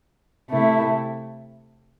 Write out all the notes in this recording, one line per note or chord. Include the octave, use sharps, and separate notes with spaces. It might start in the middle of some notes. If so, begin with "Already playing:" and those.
C3 A3 E4